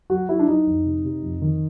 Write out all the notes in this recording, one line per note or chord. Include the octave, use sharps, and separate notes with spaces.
F#3 F#4
F#3 E4
D4
F#3 D#4
F2
C3
C3
F2
D#3